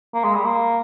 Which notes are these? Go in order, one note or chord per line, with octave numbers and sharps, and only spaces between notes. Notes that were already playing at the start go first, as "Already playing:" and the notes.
A#3
G#3
G3
A#3